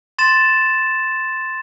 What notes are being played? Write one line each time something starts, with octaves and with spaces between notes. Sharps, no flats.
C6 A6 E7